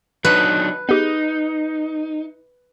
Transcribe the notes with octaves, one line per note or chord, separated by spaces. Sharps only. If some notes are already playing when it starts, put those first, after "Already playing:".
F#3 D4 D#4 B4
B3 D#4 G4 G#4